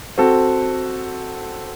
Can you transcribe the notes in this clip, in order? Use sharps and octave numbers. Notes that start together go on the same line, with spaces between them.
C4 F#4 A4